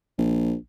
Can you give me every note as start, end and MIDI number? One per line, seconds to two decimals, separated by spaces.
0.18 0.54 34